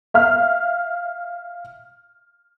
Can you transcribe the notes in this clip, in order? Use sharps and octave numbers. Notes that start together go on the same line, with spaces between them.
E5 F5 F6